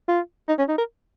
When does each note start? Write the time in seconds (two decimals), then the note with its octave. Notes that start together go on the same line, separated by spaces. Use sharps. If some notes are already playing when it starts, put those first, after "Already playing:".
0.08 F4
0.48 D#4
0.58 C#4
0.68 D#4
0.78 A#4